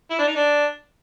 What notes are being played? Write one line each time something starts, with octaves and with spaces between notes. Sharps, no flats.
E4
D4
D#4
D4